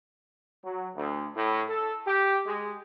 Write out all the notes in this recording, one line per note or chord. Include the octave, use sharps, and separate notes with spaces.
F#3
D2
A2
A4
G4
G#3